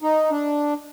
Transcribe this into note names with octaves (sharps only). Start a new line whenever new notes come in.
D#4
D4